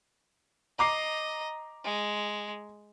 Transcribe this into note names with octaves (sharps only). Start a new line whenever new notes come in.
D#5 A#5 D6 C7
G#3